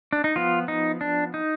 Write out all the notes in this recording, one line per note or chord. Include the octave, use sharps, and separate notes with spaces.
D4
D#4
F3 B3 F4
D#4
D4
D#4